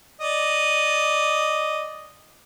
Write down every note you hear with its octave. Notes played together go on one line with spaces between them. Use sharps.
D5 D#5